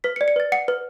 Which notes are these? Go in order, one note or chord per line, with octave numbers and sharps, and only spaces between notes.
B4 B6
C#7
D5
C#7
B4 A6
F#5 C#7
B4